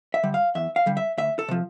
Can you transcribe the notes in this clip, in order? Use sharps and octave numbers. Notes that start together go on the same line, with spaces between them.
E5
D3 G3
F5
E2 E5
F5
D3 G3
E5
D2 E5
A4
C3 F3